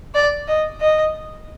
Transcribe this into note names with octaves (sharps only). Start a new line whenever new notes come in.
D5
D#5
D#5